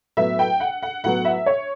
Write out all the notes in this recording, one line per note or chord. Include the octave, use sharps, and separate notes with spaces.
A2 F#3 B3 E5
G5
F#5
F#5
A2 F#3 B3 F#5
E5
C#5